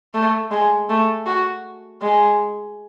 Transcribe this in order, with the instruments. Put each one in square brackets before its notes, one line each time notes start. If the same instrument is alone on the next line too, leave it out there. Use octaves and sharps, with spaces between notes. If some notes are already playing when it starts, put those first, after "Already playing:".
[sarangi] A3
G#3
A3
F#4
G#3